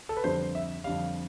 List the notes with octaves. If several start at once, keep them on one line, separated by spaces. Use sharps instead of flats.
A4
B4
F2 D3 G3 C5
E5
F2 D3 G3 F5